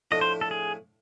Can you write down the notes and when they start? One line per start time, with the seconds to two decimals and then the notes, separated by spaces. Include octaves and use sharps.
0.11 A2 F3 A3 D4 D#5
0.21 C5
0.41 A4
0.51 G#4